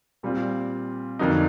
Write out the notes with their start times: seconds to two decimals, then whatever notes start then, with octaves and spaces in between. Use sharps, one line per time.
0.23 A#2 G3 C4 F4
1.19 F2 D3 F#3 A#3 D#4